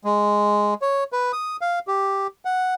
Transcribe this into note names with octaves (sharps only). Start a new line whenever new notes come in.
G#3
C#5
B4
D#6
F5
G4
F#5